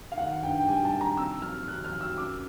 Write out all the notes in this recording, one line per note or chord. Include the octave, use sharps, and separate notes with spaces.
F5
D#3 F#5
G2 G5
G5
G3 G#5
A5
D#3
A#5
C3 E6
F#3 F6
D#3 F#6
F6
F#3
E6
F#2 D6